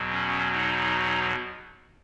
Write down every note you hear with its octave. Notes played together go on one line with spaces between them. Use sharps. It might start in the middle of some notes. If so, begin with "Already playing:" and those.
Already playing: E2 B2 F#3
C#4
D#4